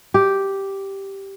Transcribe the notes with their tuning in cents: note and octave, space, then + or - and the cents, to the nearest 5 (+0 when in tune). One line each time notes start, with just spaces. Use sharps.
G4 -5